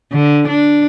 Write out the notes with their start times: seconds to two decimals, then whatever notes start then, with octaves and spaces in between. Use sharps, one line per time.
0.12 D3
0.48 D4